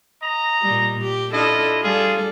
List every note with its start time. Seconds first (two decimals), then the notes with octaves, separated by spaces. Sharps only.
0.22 D#5 A#5
0.62 A#2 G3
1.03 G4
1.32 D4 E4 F4 A4 D#5
1.83 G3 F4 G#4 A4